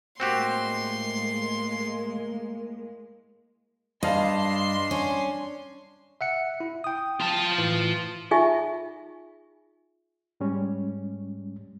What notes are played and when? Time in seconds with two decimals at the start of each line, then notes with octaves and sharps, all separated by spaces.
0.20 A2 G#3 A#3 C4 F#4 G4 C6
4.03 G2 D4 D#5 F5 A5 C6
4.91 C#4
6.21 E5 F#5 C#7
6.60 E4
6.84 G5 D#6
7.20 F4 A5
7.58 A2 E3
8.31 D#4 F4 G#4 E5 G#5 C#6
10.40 G#2 G3 G#3 C#4